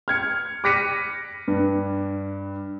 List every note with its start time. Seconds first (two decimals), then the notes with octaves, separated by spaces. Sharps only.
0.08 F6 G#6 C#7
0.64 D6 F#6 A#6 B6 C#7 D#7
1.48 G2